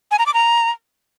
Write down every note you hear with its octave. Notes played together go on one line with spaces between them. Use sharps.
G#5
A#5
D6
A#5